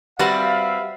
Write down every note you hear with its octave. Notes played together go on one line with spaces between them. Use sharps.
G3 C4 F#4 B4 C5 E5 F5